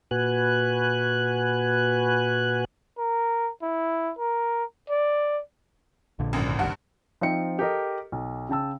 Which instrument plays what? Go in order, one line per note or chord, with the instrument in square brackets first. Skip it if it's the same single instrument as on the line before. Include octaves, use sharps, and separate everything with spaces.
[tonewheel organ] A#2 F#4 B4 G#5 F#6
[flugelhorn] A#4
E4
A#4
D5
[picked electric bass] A#1 A#2 D3
[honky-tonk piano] G#1 F#2
[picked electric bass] F1 A#1 D#3 [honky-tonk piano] G2 F#5
[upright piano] F3 C4 D#4 E5 G5 C#7
G4 A4 A#4 D#5
B1
C#3 G5 A5 E6